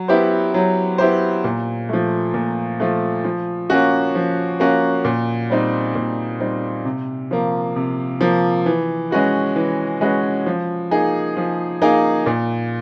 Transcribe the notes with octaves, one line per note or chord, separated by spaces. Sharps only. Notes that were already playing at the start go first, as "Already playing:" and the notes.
Already playing: F#3
B3 E4 G4 C5
F#3
B3 E4 G4 C5
A#2
F3 A3
A#2
F3 A3
F3
A#3 C#4 F#4
F3
A#3 C#4 F#4
A#2
G3 C4 D#4
A#2
G3 C4 D#4
C3
F3 A#3
C3
F3 A#3
E3
G#3 C#4 F#4 B4
E3
G#3 C#4 F#4 B4
F3
A#3 D#4 G#4
F3
A#3 D#4 G#4
A#2